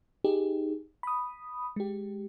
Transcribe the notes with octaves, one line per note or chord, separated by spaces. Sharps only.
D#4 G4 G#4
B5 D#6
G#3 G4